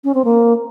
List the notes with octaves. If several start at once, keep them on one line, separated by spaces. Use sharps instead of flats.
C#4
C4
A#3